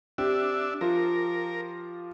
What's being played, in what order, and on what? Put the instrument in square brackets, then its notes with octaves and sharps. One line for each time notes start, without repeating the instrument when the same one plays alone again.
[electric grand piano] C4 [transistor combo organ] D4 E5 [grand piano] G4
[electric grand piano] F3 F4 [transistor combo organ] A#4